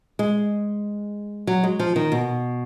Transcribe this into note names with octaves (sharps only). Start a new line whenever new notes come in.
G#3
F#3
G#3
F3
D#3
B2